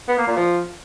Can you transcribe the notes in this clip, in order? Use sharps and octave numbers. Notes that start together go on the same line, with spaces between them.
B3
A#3
A#2
F3